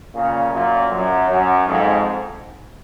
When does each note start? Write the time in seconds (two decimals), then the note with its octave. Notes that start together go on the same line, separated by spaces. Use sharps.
0.14 A#2 C#3
0.53 F#2 A#2
0.91 F#2
1.29 F#2
1.66 F2 G#2